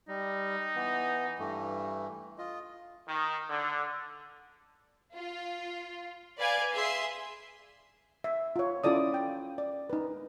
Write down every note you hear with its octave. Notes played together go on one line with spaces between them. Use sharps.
G3 D#4
E3 B3
G2 E3 A3
F4 D#5
D#3
D3
F4
B4 D5 F5 G#5
G#4 E5 C6
E5
F4 C#5
C#4 E4 F4 A4 D5 D#6
G5
D5
D#4 B4